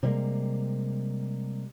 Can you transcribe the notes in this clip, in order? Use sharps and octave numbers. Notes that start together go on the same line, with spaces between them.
C3 G3 G#3 A#3